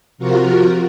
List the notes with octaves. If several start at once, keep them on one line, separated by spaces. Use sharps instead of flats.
C3 F3 F4 F#4 A#4